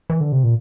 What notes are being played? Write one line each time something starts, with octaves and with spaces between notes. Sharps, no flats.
E3
D3
C3
A#2